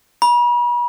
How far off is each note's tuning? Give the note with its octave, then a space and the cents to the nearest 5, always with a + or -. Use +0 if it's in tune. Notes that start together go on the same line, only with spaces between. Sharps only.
B5 -40